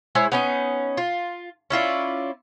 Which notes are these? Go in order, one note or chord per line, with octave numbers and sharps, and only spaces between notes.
G#3 E4 C5 C#5
B3 C#4 D#4
F4
C#4 E4 F4 D5